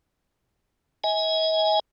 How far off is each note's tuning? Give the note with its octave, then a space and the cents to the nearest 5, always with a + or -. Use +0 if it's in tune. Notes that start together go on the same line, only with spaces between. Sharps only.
D#5 +45 G#5 +0